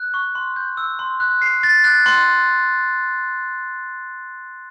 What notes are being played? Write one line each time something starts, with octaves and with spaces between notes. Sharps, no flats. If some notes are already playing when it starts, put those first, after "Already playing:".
Already playing: F#6
C#6
C6
G6
E6
C6
F#6
C7
A6
F#6
C6